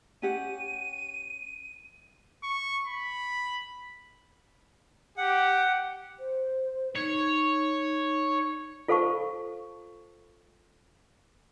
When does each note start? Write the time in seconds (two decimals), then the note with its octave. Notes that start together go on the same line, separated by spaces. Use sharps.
0.22 C#4 G4 F#5 D#7
2.43 C#6
2.87 B5
5.18 G4 F#5
6.19 C5
6.96 D#4 C#5
8.88 F4 A4 C5 F5 A5 C#6